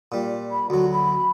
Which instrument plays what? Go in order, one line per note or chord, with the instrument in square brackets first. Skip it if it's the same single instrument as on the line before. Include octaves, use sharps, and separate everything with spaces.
[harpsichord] A#2 G3
[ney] B5
[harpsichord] D2 F#3 [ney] F#4
[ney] B5